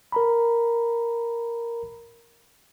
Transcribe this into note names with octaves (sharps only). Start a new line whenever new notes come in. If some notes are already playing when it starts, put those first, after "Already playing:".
A#4 A#5 B5